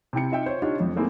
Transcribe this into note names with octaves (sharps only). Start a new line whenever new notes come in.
C3 E4 G5 C#7
D#4 F4 E5 G5
C5 C#5
D4 D#4 F4 G4 C#5
F2
A3 A#3 C4 E4 G#4